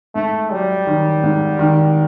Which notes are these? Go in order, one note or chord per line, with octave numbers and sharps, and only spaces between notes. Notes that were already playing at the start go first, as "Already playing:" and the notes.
G#2 A3
F#3 G3
D#3
G#2
D#3